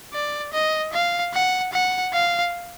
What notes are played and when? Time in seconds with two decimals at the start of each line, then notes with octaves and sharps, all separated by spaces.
0.13 D5
0.53 D#5
0.93 F5
1.33 F#5
1.73 F#5
2.13 F5